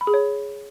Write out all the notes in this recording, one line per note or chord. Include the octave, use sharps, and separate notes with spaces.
B5
G#4
C#5